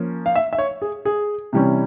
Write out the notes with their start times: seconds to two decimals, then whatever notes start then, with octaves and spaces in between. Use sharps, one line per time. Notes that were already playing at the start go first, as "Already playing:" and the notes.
Already playing: F3 A#3 C#4
0.26 F5
0.36 E5
0.53 E5
0.58 C#5
0.82 G#4
1.05 G#4
1.53 C3 E3 G3 C#4